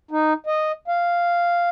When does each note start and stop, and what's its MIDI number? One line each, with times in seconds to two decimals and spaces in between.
0.11 0.33 63
0.46 0.72 75
0.88 1.69 77